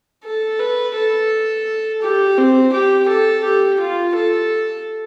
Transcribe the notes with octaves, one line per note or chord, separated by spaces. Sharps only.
A4
B4
A4
G4
C4
G4
A4
G4
F4
A4